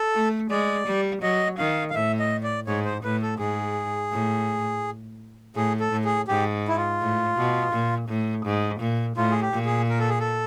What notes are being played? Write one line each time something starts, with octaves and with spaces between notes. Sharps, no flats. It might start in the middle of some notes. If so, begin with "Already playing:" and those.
Already playing: A4
A3
G#3 D5
G3
F#3 D#5
D#3 F5
F5
A2 E5
D#5
D5
G#2 C#5
C5
A2 B4
A4
G#2 G#4
A2
A2 G#4
A4
A2
G#4
G#2 G4
E4
F4
A2
B2
A#2
A2
G#2
A#2
A2 F4
G#4
G4
A#2
G#4
A#4
A4
G#4
A4